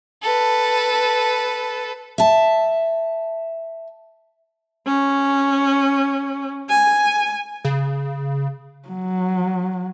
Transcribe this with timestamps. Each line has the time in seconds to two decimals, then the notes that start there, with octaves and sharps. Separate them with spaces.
0.23 A4 B4
2.18 E5 A5
4.86 C#4
6.69 G#5
7.65 C#3
8.89 F#3